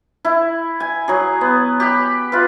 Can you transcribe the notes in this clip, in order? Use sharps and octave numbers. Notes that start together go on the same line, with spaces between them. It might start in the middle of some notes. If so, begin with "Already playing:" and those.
E4
G#5
F#3 G#4
B3
G4 B5
F4 B4